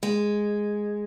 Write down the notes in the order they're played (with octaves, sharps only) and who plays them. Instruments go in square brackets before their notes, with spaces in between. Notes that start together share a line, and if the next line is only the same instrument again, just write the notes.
[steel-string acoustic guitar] G#3